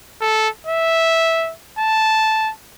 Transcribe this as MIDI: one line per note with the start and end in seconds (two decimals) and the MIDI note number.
0.21 0.49 69
0.67 1.53 76
1.79 2.52 81